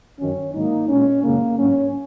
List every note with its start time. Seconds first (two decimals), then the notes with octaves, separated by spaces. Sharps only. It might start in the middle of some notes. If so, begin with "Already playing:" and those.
0.19 F#2 D#3 F#3 C#4
0.54 G#2 D#3 F#3 A#3 D#4
0.89 A#2 G#3 C#4
1.23 F#2 C#3 G#3 A#3
1.58 G#2 F#3 C#4